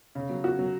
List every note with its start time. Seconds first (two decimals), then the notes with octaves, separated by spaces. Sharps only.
0.15 C#3
0.30 F#3
0.44 F#4
0.59 F#3